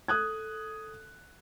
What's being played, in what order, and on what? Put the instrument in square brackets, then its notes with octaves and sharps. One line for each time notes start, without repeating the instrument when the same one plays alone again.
[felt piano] A4 D#6 F#6 G#6